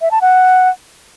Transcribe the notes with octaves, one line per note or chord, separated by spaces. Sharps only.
E5
A5
F#5